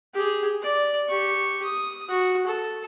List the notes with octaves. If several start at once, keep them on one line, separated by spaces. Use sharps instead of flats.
G4 G#4
D5
G4 C#6
D#6
F#4
A4